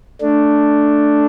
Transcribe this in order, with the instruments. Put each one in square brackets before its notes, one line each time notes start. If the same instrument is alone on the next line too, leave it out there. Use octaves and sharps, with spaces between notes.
[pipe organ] A3 D4